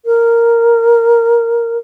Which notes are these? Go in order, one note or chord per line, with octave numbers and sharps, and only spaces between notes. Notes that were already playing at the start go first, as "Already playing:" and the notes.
A#4